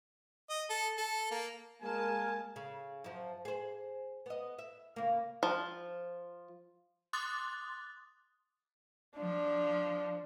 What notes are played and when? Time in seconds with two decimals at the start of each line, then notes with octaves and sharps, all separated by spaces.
0.50 D#5
0.70 A4
0.97 A4
1.31 A#3
1.82 G#3 A#3 A#4 G#5 A5
2.56 C#3
3.04 F#2 F3
3.45 G#4 C5
4.26 B3 D#5
4.59 E5
4.96 C#3 A#3
5.43 F3
7.13 C6 D6 D#6 F#6 A6
9.19 F3 D4